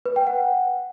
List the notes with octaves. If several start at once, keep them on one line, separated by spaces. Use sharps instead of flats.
B4
G5
F#5